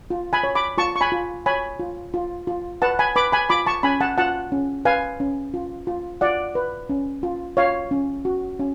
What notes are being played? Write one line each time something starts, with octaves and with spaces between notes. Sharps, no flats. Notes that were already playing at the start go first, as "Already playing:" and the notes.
F4
G#5 B5
C#5
B5 D6
F4 A5 C#6
C#6
G#5 B5
F4
C#5 G#5 B5
F4
F4
F4
B4 F#5 A5
G#5 B5
B4 B5 D6
G#5 B5
F4 B5 D6
A5 C#6
C#4 G#5 B5
F#5 A5
F4 F#5 A5
C#4
B4 F5 G#5
C#4
F4
F4
F4 D5 F#5
B4
C#4
F4
F4 C#5 F5
C#4
F#4
C#4